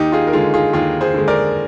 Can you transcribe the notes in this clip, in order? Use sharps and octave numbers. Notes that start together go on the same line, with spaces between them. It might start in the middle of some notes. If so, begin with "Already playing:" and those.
Already playing: D#2 D#4 G4
F4 G#4
A#4
D3 G#3 F4 G#4
F4 G#4
D#2 F4 G#4
G#4 C5
D3 G#3
A#4 D5